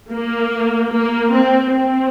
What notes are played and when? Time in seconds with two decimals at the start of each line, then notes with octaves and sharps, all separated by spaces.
0.11 A#3
0.92 A#3
1.33 C4
1.74 C4